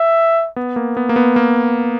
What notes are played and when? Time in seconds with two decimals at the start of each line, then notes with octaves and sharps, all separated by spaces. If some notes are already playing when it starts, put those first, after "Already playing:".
Already playing: E5
0.56 B3
0.76 A#3
0.97 B3
1.09 A#3
1.16 B3
1.36 A#3